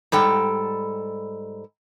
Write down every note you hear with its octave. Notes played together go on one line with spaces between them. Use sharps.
G#2 G3 A4 G5